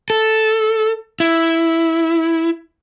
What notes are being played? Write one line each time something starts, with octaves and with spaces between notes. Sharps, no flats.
A4
E4